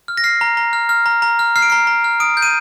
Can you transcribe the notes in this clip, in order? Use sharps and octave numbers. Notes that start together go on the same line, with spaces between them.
F6
A#6
F6 C7
A#5
A#5
F6
F6
A#5
A#5
F6
F6 C7
D7
A#5 C7
A#5
F6
D#6 D7
G6
D#7